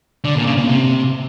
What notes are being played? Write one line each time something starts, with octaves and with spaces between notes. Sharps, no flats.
D3
A#2
C#3
A#2
C3